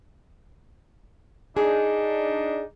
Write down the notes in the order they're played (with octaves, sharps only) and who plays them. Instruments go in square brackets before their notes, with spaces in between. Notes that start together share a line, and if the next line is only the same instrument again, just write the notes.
[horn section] D4 D#4 [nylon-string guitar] G#4